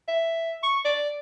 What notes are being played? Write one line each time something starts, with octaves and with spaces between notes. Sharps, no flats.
E5
C#6
D5